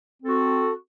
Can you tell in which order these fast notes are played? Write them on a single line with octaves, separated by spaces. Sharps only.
C4 A4 F#4